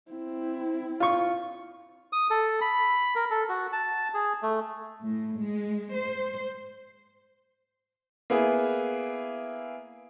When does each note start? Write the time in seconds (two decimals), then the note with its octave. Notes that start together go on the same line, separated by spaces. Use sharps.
0.11 C4 E4
1.00 F4 C#6
2.13 D#6
2.30 A4
2.61 B5
3.15 A#4
3.31 A4
3.49 F#4
3.72 A5
4.14 G#4
4.42 A3
5.04 A2
5.39 G#3
5.94 C5
8.30 A#3 B3 E4 G#4